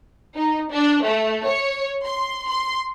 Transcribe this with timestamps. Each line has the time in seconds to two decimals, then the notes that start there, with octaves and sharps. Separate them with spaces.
0.36 D#4
0.71 D4
1.05 A3
1.47 C#5
2.04 C6
2.47 C6